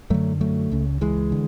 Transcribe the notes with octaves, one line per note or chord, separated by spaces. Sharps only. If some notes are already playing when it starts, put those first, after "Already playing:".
F#2 D3 F#3 A3
F#3 A3
C#2 C#3
E3 G#3
D3